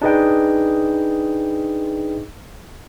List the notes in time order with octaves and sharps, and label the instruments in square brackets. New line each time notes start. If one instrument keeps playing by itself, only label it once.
[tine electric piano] D4 D#4 G#4 B4 D#5 G5